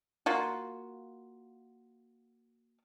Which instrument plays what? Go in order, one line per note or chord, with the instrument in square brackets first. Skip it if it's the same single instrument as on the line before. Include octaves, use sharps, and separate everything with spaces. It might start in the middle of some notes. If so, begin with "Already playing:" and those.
[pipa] A#3 F4 F#4